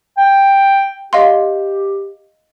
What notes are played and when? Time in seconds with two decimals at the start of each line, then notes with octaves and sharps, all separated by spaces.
0.18 G5
1.13 G4 D#5 F5 C6